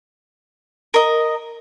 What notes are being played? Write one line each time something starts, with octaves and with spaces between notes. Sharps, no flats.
A#4 D#5